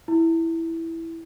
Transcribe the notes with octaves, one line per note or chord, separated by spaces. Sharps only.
E4